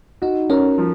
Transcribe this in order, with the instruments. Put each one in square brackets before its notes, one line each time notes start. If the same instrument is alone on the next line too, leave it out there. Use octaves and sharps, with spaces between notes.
[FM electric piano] D#4 [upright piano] F#4
[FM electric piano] C#4 [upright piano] A#4
[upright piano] F3